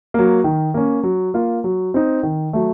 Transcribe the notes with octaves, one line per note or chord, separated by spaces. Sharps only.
F#3 A#3
D#3
A#3 C#4
F#3
A#3 F4
F#3
C4 D#4
D#3
F#3 A3